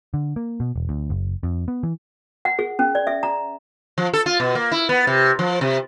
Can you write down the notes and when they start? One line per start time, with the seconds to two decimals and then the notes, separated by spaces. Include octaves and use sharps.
0.14 D3
0.36 A#3
0.60 B2
0.76 E1
0.89 D2
1.10 F#1
1.43 F2
1.68 B3
1.83 E3
2.45 F#5
2.59 G#4
2.79 C#4
2.95 D5
3.07 E5
3.23 A#5
3.98 F3
4.14 A4
4.26 F4
4.40 B2
4.55 A#3
4.72 E4
4.89 B3
5.07 C3
5.39 F3
5.61 C3